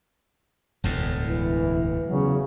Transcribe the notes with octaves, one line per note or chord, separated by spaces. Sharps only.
E1 D2 A2
E3
E2 C#3 F#3